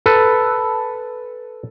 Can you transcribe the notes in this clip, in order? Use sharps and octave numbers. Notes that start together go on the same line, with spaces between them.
A4 B4